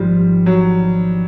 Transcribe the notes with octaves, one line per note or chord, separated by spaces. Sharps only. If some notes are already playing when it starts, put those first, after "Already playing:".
Already playing: G#1 G#2 F3 G3
F#3